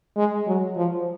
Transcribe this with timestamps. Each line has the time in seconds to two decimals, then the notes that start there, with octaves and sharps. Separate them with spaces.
0.16 G#3
0.47 F#3
0.76 F3